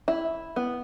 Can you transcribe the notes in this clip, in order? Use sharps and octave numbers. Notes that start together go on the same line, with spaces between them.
E4
B3